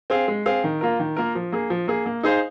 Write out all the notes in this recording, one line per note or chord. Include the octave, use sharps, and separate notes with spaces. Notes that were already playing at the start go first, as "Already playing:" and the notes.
C4 G#4 F5
G#3
C4 G#4 F5
D#3
A#3 F4 A#4
D#3
A#3 F4 A#4
F3
A#3 G#4
F3
A#3 G#4
A#3
D#4 G#4 C5 F5